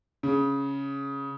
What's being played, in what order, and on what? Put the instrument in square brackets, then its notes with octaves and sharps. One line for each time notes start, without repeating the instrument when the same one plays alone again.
[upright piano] C#3